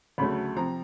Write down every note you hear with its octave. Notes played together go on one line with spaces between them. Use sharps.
D2 C#3 F#3 A3 B5
C3 F3 A#5